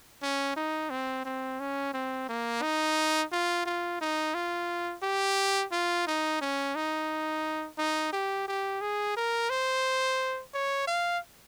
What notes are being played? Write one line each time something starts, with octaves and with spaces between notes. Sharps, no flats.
C#4
D#4
C4
C4
C#4
C4
A#3
D#4
F4
F4
D#4
F4
G4
F4
D#4
C#4
D#4
D#4
G4
G4
G#4
A#4
C5
C#5
F5